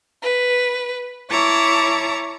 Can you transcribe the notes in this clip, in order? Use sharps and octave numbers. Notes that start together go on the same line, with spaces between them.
B4
E4 C#5 A5 A#5 D6